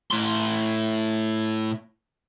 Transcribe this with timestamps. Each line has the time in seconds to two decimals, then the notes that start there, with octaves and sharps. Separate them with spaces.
0.11 A2 C6